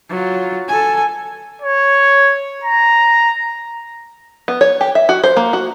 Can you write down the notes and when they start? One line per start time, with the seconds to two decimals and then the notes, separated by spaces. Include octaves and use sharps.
0.10 F#3 F4
0.68 A4 G#5
1.62 C#5
2.64 A#5
4.48 B3
4.61 C#5
4.81 G4
4.95 E5
5.09 F#4
5.24 C5
5.37 A#3
5.53 F#4